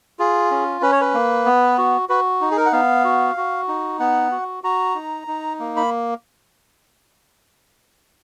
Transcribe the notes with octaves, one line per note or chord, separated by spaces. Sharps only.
F4 G#4
C#4
C#4 B4
C#5
B4
A#3
B3
F#4
F#4 B4
D#4
G#4
A#4
F#5
B3 F5
F#4
F#4
D#4
B3 F#5
F#4
F#4 A#5
D#4
D#4
A#3
B5